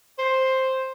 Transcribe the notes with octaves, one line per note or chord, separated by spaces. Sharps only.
C5